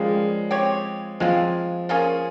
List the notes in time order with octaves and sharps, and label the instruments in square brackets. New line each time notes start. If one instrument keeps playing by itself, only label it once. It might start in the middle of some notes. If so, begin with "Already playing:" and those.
Already playing: [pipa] C#3 G3 A#3 [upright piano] F3 G#3
[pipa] C4 G4 C#5
[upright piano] F3 [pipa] G#3 C4 F4
[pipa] A#3 C#4 F4 G#4